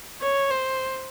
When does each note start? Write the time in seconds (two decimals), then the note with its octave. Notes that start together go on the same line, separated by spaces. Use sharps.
0.21 C#5
0.50 C5